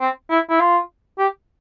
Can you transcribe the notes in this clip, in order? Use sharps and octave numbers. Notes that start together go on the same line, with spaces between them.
C4
E4
E4
F4
G4